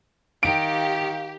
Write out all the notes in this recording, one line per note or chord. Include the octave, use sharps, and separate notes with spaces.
D#3 G4 F5 D7